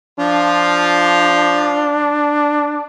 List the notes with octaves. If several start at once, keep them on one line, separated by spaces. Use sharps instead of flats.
F3 D4 F4